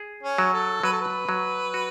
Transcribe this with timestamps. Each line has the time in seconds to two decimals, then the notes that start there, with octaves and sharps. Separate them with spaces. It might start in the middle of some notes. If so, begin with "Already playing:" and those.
Already playing: G#4
0.23 C#4
0.38 F#3
0.53 A4
0.83 F#3 B4
0.92 A4
1.01 B4
1.29 F#3
1.74 F#4